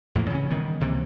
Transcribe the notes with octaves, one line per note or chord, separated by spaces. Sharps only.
E2 A2 F3 A#3
C#3 E3 F#3 C#4
D#3 E3 G3 B3
C#2 C3 E3 A#3